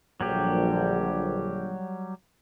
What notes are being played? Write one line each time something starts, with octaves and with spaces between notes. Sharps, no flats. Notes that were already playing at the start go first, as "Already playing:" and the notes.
A#1 D3 F#3 G3 G4